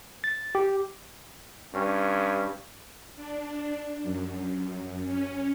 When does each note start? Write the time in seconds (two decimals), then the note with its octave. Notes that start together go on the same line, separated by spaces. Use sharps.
0.24 A6
0.55 G4
1.75 G2 C#4
3.15 D4
4.03 F#2
5.05 C#4